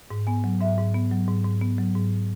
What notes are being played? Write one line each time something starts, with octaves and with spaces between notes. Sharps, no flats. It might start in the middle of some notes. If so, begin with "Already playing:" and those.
G#2
B3 G#5
F#3
G#2 E5
G#2
B3
F#3
G#2
G#2
B3
F#3
G#2